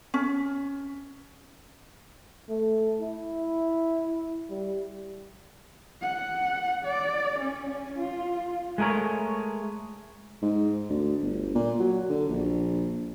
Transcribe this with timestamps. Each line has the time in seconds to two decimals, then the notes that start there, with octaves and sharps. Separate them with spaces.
0.14 C#4
2.49 A3
3.00 E4
4.50 G3
6.01 F#5
6.85 D5
7.39 C#4
7.69 C#4
7.99 F4
8.78 G#3 A3 G#4 A#4 C#5
10.42 G#2
10.90 D2
11.22 G1
11.55 A#2
11.80 F#3
12.10 D3
12.29 A#1